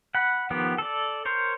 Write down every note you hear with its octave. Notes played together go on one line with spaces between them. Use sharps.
F#5 B5
D#3 F3 B3 G4
A4 D5
A#4 C5 C#5